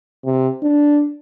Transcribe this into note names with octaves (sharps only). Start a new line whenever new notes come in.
C3
D4